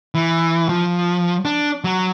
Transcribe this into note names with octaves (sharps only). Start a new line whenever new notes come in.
E3
F3
D4
F#3